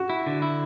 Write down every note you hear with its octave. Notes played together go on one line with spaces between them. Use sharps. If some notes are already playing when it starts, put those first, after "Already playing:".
Already playing: F#4
E4
D3
E4